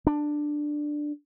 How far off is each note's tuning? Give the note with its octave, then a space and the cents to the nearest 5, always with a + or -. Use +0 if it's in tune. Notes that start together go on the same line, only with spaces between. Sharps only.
D4 +10